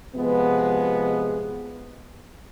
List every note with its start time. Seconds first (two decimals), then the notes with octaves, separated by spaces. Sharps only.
0.16 C3 F3 G#3 B3